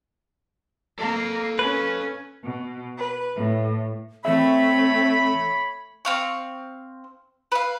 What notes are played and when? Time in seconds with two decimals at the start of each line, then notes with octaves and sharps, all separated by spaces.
0.99 A#3 A4 F5
1.59 C#4 B4
2.43 B2
2.97 B4
3.36 A2
4.25 E3 A3 C4 C#5 E5 B5
6.05 C4 F5 C#6
7.52 B4 F5